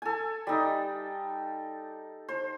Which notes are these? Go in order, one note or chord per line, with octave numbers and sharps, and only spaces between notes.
A4 G#5
G3 D#4
C5